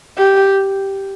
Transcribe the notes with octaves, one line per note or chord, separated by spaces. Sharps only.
G4